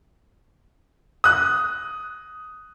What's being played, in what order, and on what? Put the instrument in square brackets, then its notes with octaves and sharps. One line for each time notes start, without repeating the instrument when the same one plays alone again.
[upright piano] D#6 F#6